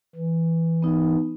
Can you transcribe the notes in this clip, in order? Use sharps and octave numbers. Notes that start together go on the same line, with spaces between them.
E3
B3 D#4